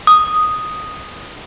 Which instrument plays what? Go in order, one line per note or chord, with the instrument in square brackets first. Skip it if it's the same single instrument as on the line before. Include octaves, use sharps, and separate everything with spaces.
[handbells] D#6